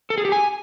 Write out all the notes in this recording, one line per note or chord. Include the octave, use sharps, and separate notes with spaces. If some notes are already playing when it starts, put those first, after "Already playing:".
A4
G#4
G4
G#5